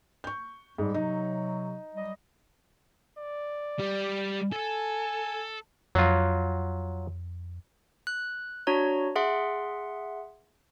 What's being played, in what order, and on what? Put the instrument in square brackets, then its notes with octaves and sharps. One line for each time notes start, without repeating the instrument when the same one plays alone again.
[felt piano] C#6 G6
[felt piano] G#2 [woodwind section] G3
[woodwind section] C3 F#3 [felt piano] D#4
[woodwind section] F#3 G3 D#5
[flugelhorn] D5
[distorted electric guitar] G3
[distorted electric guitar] A4 [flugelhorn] G#5
[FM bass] F2 [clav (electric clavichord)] F#3 F4
[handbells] F#6
D4 F#4 C#5 A#5
G#4 E5 F#5 C6